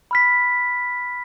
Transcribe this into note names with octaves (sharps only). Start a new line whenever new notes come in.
B5 F6 B6